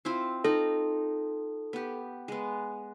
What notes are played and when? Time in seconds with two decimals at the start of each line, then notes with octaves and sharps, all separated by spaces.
0.05 C4 E4 F4
0.44 D#4 F4 A4 A#5
1.73 B3 G4
2.28 G#3 B3